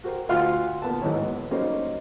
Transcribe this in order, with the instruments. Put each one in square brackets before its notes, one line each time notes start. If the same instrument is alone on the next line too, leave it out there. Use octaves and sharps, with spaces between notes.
[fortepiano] F#4 G4 A#4 C5
D2 F4 F5 F#5 C6 F6
A#2 B3 A#4 A5
A1 G#2 D#3 E3 C#5
B3
F#3 G3 A#3 C#4 D#4 C5